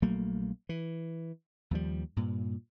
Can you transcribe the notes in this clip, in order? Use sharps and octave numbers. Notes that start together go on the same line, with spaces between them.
A#1 F#3 A3 A#3
E3
D#2 F3 G3
G2 A#2